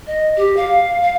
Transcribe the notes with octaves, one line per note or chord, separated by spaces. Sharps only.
D#5
G4
F5
F5